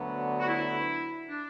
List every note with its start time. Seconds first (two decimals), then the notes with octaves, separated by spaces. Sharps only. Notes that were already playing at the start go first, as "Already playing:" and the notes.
Already playing: D2 D3 F#3 B3
0.39 F#4
0.48 E4
1.30 D4